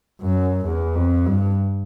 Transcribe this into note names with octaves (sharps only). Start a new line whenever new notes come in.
F#2
E2
F2
G2